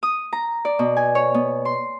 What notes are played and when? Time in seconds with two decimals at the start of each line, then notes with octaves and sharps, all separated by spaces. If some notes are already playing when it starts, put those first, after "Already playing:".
0.03 D#6
0.33 A#5
0.65 D5
0.79 B2
0.97 G#5
1.15 C#5
1.34 B3
1.65 C6